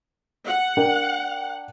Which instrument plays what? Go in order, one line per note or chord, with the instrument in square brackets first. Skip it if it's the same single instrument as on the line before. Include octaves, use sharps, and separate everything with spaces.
[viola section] F#5
[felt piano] D4 A#4 G5